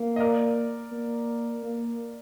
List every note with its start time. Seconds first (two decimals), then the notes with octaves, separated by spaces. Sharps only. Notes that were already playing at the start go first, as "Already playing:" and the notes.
Already playing: A#3
0.16 D#5
0.20 A#4 D5
0.92 A#3
1.63 A#3